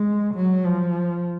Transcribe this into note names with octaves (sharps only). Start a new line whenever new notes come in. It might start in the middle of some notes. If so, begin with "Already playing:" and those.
Already playing: G#3
F#3
F3